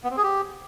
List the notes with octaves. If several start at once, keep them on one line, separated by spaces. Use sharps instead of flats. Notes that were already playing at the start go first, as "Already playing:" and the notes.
B3
C4
G#4
G4